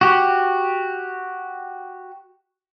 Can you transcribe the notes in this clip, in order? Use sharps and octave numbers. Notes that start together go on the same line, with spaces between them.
F#4 G4